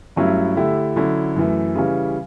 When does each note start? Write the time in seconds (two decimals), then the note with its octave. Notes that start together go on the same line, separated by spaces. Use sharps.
0.16 G2 F#3 A3 C#4 E4
0.56 D3 A3 E4 G4
0.96 D3 F#3 C#4 E4
1.36 F#2 E3 A3
1.76 C#3 E3 G3 C#4